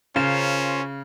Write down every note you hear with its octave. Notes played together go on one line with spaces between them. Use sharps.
C#3 C#4 F4 A#4 C5